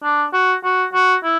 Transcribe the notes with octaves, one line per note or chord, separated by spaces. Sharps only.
D4
F#4
F#4
F#4
E4